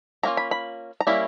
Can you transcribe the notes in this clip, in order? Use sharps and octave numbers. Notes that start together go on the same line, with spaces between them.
F#3 A#3 C#4 F4 A#5
B5
B5
A#5
G3 A#3 C#4 E4 B5